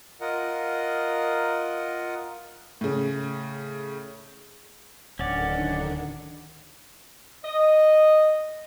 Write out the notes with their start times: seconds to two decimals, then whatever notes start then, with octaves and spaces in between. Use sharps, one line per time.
0.21 F4 A#4 D#5 F#5
2.81 A2 C#3
5.19 D1 D3 D#3 C#4 D4 D5 F#5
7.45 D#5